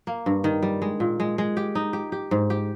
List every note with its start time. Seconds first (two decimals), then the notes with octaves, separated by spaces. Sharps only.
0.07 A#3
0.26 G2
0.44 D#3
0.63 G3
0.82 G#3
1.00 A#2
1.20 G#3
1.38 G#3
1.57 G4
1.75 D#4
1.93 G4
2.12 G4
2.31 G#2
2.50 G4